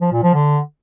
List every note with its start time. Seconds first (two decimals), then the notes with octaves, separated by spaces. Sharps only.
0.01 F3
0.12 A#2
0.23 F3
0.34 D3